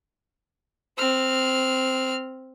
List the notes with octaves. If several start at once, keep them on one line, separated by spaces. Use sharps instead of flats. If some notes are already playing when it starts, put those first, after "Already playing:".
C4 F6